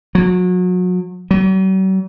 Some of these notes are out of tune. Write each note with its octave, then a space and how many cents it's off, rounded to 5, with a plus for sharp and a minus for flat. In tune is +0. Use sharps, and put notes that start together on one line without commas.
F#3 -35
F#3 +45